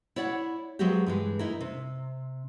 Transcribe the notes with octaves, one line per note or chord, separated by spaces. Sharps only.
E4 C#5 D5 F#5
F3 F#3 G#3 B3 F#4 G4
G2 E3 G#3
D#4 E4 A#4
C3